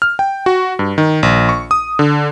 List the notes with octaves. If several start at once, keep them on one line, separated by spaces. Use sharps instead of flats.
F6
G5
F#4
G2
D#3
A#1
C#6
D#6
D3